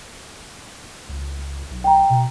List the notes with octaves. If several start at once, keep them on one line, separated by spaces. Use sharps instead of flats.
C#2
B1
G5 A#5
B2